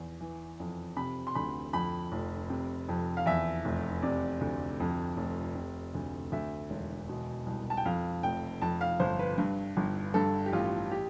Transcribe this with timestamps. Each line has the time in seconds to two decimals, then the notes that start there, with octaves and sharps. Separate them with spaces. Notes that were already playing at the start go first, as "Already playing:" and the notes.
Already playing: E2
0.21 E3
0.60 F2
0.97 C3 B5
1.27 C6
1.35 D2 B5
1.73 F2 B5
2.12 F1
2.50 C3
2.89 F2
3.17 F5
3.26 E2 E5
3.65 F1
4.03 C3 D5
4.41 D2
4.80 F2
5.17 F1
5.55 C3
5.95 D2
6.32 D2 E5
6.70 E1
7.09 B2
7.46 C2
7.70 A5
7.77 G5
7.85 F2 F5
8.23 F1 G5
8.62 F2 A5
8.81 F5
9.00 G1 C5
9.19 B4
9.38 G2
9.77 G1
10.14 G2 A4
10.46 G4
10.53 A1 F4
10.91 G4